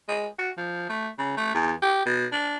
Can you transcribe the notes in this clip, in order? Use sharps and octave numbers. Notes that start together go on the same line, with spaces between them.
G#3
F#4
F3
A3
C#3
A3
E2
G4
B2
D4